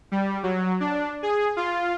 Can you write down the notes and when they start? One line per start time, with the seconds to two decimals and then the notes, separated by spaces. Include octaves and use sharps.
0.12 G3
0.43 F#3
0.80 D4
1.23 G#4
1.57 F4